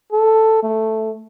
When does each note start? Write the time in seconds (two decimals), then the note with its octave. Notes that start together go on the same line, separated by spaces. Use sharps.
0.13 A4
0.63 A3